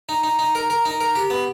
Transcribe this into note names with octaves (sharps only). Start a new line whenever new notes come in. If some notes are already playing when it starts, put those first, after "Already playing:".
D#4
D#4
D#4
A#4
A#4
D#4
A#4
G4
B3